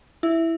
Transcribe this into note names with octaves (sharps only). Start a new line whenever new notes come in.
E4